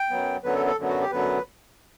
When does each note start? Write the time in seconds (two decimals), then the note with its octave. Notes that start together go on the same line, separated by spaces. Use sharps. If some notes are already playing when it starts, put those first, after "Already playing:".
Already playing: G5
0.10 F#2 F#3 B3
0.44 F#2 D3 F#3 B3 B4
0.56 A4
0.66 A4
0.78 F#2 D3 F#3 B3
0.89 F#4
1.01 G4
1.12 F#2 D3 F#3 B3 B4